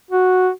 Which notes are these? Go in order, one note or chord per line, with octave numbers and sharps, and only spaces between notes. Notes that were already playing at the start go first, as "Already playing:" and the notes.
F#4